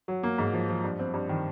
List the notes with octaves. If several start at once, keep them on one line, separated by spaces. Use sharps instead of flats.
F#3
A#3
G#2
F3
F3
G2
C4
G2
D#3